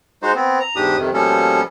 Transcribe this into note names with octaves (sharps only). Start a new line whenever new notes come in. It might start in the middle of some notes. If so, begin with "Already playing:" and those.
G#3 D#4 F#4 C5
B3 C4
A#5
E2 G#2 D4 G4 D#6
F2 C3 D#3
B2 F3 G3 A#3 C#4 A4